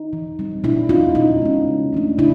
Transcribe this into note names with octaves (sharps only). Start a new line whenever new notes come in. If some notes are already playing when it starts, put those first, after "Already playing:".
Already playing: D#4
E3
G3 C4
B2 D4 E4
G#3 C#4 D#4 F4
B2 D#4
G#3 C#4
C#3
E3 A3 D4
C#3 D4 E4